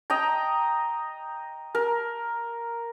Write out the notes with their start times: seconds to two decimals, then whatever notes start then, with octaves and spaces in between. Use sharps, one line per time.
0.10 D#5 G5 A#5
1.75 A#4